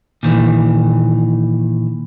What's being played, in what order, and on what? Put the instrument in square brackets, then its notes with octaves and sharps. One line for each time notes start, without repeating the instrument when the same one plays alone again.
[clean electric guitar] A#2 D#3 E3